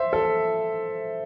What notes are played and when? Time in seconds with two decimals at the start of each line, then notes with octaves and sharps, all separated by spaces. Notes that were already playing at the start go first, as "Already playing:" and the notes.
Already playing: C5 E5
0.13 A4